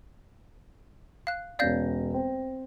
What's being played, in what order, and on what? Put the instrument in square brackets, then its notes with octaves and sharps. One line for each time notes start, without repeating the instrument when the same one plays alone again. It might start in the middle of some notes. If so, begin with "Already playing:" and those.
[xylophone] F5 F#6
[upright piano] E1 C#4 A#6 [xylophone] D5 F5 G6
[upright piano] C4 C5 G5